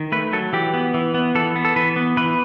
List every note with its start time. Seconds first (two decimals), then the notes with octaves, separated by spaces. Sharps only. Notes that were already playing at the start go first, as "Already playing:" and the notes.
Already playing: D#3
0.12 A3 B4
0.33 F#3 A4
0.53 E3 G4
0.74 B3
0.94 E3
1.14 B3
1.35 E3 A4
1.56 B3
1.65 A4
1.76 E3 B4
1.96 B3
2.17 E3 B4